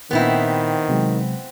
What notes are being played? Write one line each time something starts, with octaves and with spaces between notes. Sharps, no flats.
A#2 D#3 B3 C4 E4 B4 F#5
C3 F#3 G#3